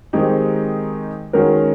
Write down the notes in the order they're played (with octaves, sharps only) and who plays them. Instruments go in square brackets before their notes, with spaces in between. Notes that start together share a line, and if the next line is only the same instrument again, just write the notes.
[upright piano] D#3 G#3 C4 D#4 G4
D#3 G#3 C#4 F#4 A#4